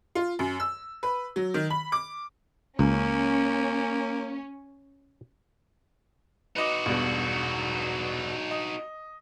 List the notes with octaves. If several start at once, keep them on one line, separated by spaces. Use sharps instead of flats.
F4
F#2
E6
B4
F#3
D#3
B5
D6
C#2 A#3 C#4
D#4 F#4 B4 D#5 D6
E1 G2 B2
D#5